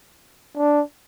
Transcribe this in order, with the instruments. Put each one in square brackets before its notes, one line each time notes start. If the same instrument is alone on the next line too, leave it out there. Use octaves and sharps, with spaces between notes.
[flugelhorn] D4